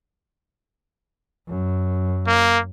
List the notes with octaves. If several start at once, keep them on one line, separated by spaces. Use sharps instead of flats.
F#2
A#3